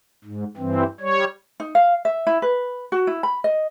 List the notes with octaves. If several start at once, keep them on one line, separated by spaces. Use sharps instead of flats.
G#2
G2 E3 C4
G3 C#5
D#4
F5
E5
E4
B4
F#4
E4
B5
D#5